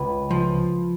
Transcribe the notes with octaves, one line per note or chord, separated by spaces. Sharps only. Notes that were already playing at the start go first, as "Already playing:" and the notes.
Already playing: C#2 B4
F3